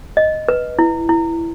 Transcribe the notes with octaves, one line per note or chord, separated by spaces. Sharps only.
D#5
B4
E4
E4